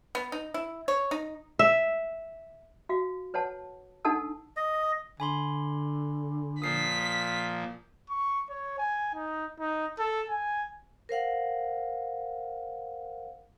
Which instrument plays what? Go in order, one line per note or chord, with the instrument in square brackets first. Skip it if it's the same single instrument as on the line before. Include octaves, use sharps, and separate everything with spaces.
[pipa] B3
D#4
E4
C#5
D#4
[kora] E5
[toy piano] F#4 F5
B4 C#5 F#5 A5
D4 D#4 A4 F#5 A5 E6
[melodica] D#5
[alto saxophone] D3 [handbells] G#5 B5 C6
[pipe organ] A#2 F3 [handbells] D#6 C7 [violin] B6
[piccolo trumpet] C#6
C#5
G#5
D#4
D#4
A4
G#5
[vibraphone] A#4 C5 F5 F#5